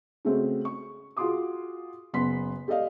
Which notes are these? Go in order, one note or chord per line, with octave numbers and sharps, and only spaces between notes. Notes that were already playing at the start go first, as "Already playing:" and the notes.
C#3 G#3 A3 C4 F#4
C#6
F4 F#4 G#4 C6 D6 D#6
F#1 B3 C6 B6
G4 A4 D5 D#5 F5